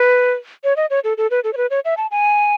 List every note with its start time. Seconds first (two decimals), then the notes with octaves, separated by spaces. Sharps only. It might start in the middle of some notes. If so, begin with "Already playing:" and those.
Already playing: B4
0.64 C#5
0.77 D#5
0.90 C#5
1.04 A4
1.18 A4
1.31 B4
1.44 A4
1.53 C#5
1.57 B4
1.70 C#5
1.85 E5
1.97 A5
2.11 G#5